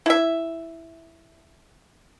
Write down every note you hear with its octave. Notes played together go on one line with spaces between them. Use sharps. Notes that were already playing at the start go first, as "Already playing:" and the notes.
E4 E5